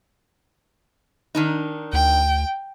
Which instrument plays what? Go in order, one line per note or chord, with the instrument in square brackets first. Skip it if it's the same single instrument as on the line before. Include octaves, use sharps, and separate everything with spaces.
[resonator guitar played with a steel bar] D#3 D4 D#4
[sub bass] D2 [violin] G5